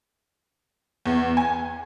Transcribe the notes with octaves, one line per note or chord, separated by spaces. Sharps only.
E2
G#5